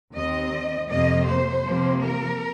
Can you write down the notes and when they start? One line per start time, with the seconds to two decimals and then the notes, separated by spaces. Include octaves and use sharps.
0.14 D#2 D#3 C4 D#5
0.89 F2 C3 F3 A#3 D#5
1.26 C5
1.64 C3 F3 A#3
2.00 A#4